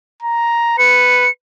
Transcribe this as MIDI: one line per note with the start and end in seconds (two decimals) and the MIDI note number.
0.22 0.78 82
0.78 1.28 71
0.78 1.30 97